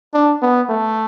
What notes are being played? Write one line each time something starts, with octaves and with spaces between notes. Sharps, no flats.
D4
B3
A3